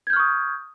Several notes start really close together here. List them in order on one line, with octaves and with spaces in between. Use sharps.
G#6 G6 F6 C#6 D#6